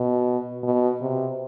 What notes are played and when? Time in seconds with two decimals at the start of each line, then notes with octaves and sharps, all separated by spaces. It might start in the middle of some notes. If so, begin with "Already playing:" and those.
Already playing: B2
0.63 B2
1.01 C3